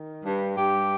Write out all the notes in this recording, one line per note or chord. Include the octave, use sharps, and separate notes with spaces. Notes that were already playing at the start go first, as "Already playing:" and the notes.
Already playing: D#3
G2
G2 G4